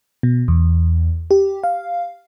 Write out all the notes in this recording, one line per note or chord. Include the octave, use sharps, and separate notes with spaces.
B2
E2
G4
F5